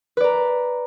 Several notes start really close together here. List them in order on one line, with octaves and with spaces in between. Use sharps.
B4 D5 A#5